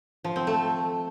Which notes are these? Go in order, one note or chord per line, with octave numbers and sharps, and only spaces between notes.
F3
C4
A3